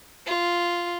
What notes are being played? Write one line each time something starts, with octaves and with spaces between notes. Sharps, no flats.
F4